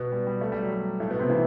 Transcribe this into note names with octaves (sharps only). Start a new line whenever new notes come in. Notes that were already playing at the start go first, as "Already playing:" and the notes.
Already playing: B2 B3
G3
G3
A3
G3
F#3
G3
A2 A3
B2 B3
C3 C4
E3 E4